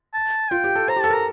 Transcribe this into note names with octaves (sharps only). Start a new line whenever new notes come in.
A5
F4 G5
G4
A4
C5 A#5
G4
A4 A5
A#4
A#5